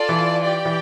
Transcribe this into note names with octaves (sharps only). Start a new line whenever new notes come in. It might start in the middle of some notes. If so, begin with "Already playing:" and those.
Already playing: F4 A4 D5 A5
E3
G4 D5 G5
E3